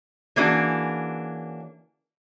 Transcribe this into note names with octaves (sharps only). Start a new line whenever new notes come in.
E3 A#3 C#4 D4 F#4 G#4